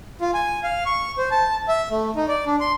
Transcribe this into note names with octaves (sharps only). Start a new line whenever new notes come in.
F4
G#5
F5
C#6
C5
A5
E5
A3
D#4
D5
D4
C6